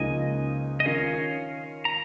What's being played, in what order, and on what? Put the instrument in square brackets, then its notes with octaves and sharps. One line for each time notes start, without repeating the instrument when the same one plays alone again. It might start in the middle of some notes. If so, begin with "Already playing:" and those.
Already playing: [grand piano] C#2 C#3 F3 A#3 D#4 [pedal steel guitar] D#5 G#5
[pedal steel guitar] D#5
[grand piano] D#3 C#4 F4 A#4 [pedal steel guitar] C#5 F5
[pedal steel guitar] A#5